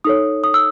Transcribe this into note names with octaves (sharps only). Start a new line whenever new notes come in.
D#4 A4 C#5 D#6
D#6
E6